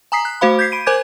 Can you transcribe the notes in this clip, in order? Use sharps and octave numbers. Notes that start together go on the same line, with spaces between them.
G#5 A#5 D#6 B6 C7
F#6
A3 F#4 C5 F5 B5
G6 G#6 B6 C7
B5 D7 D#7
A#4 C5 G#5 D6 G6 G#6